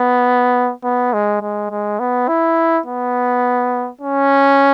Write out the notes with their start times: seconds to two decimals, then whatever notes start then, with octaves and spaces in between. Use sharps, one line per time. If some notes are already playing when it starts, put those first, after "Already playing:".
Already playing: B3
0.84 B3
1.13 G#3
1.42 G#3
1.71 G#3
2.00 B3
2.28 E4
2.86 B3
4.01 C#4